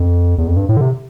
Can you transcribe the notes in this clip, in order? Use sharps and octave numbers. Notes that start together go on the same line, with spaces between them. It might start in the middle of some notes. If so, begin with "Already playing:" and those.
Already playing: F2
E2
F2
G2
A2
D3
C3